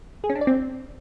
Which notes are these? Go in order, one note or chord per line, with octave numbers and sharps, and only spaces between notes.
G#4
C#4
D4
D5
C4